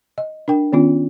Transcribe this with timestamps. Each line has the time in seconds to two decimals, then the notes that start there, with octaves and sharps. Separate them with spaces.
0.18 D#5
0.48 D4 A#4 G5
0.73 D#3 B3 C#4 F4